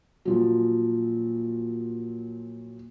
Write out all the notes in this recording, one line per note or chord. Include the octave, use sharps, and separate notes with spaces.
A#2 F3 F#3